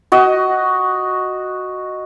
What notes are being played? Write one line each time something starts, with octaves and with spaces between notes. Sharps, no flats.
F#4 D#5